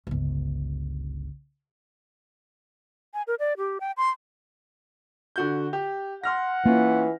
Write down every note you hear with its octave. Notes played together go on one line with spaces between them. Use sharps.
G1 C#2
G#5
A#4
D5
G4
G5
C6
D3 F#4 G6
G4
F#5 C6 F6 A#6
E3 A#3 C#4 F4